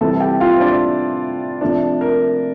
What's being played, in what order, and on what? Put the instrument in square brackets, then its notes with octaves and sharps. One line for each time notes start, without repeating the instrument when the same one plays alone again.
[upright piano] C3 E3 G3 A4 A5
A5
G4 G5
F4 F5
C5
D4 D5
C3 F3 A3 D4
A#4